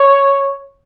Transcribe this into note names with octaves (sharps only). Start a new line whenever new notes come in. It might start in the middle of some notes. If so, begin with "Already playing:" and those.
Already playing: C#5